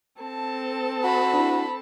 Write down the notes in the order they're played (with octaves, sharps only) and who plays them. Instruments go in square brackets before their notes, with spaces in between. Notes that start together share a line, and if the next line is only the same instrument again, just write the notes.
[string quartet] C4 A4 A5
[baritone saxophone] F#4 [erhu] B5
[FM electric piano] D4 E4